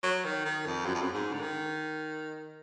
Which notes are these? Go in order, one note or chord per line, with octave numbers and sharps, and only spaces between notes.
F#3
D#3
D#3
F2
F#2
F2
F#2
G#2
D3
D#3